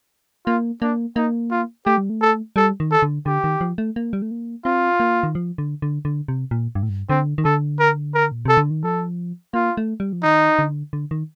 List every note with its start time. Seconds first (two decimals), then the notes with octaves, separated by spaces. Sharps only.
0.46 A#3 F4
0.82 A#3 D4
1.16 A#3 D#4
1.51 F4
1.86 A3 G4
1.98 G3
2.10 A3
2.21 A4
2.56 G3 A4
2.80 D#3
2.92 A4
3.02 D3
3.26 D3 G4
3.44 D#3
3.61 F3
3.78 A3
3.96 A#3
4.13 G3
4.22 A3
4.31 A#3
4.65 C4 F4
5.00 A#3
5.23 D#3
5.35 F3
5.58 D3
5.82 D3
6.05 D3
6.28 C3
6.51 A#2
6.75 G2
6.83 A2
6.89 G2
7.09 D3 C4
7.38 D#3
7.45 D3 A4
7.79 A#4
8.15 A#4
8.32 A#2
8.45 C3 A4
8.57 D3
8.70 D#3
8.84 F3 A4
9.54 A#3 F4
9.77 A3
10.00 G3
10.13 F3
10.23 D#3 D#4
10.59 D3
10.93 D3
11.11 D#3